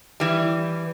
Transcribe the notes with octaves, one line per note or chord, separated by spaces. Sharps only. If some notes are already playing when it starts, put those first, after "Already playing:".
E3 G3